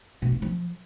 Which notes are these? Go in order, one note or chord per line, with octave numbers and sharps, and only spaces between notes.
B2
G#3
F3